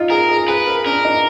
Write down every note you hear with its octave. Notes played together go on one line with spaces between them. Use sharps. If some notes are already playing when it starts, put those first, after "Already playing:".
Already playing: D#4 F4
G#4 A#4
G#4
G#4 B4
A#4
D4 A#4
D#4